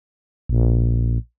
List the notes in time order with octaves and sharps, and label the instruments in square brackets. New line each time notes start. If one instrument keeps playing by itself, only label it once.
[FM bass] A#1